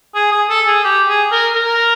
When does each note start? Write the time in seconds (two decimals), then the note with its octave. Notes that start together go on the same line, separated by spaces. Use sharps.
0.14 G#4
0.31 G#4
0.49 A4
0.67 G#4
0.84 G4
1.08 G#4
1.31 A#4
1.54 A#4